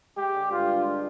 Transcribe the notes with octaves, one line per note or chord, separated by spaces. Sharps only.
G#3 G4
D3
G2 F4
D4
G#3